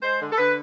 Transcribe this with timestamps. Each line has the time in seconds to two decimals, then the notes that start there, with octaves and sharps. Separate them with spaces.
0.03 G#3 C5
0.21 D3
0.32 A4
0.38 D3 B4